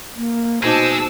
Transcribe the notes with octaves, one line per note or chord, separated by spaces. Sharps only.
A#3
B2 G#3 D#4 C5 A5 D6 E6